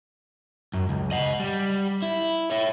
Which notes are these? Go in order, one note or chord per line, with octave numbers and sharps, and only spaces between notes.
F#2
C#2
D#5 F#5
G3
E4
C#5 E5